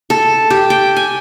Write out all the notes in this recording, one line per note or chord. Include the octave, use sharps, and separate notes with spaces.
A4
G4
G5
G#5